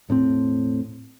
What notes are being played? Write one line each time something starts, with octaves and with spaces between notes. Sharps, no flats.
E1 A2 B3 C4